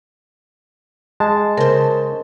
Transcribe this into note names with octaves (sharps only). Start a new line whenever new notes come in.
G#3 A5
C#3 A#4 C5